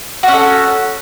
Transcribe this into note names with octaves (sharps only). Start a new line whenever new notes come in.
C#4 F#4 A4